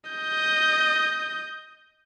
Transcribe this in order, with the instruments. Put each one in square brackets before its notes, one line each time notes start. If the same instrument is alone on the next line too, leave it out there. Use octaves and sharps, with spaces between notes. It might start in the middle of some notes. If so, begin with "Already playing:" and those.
[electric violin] D#5 G6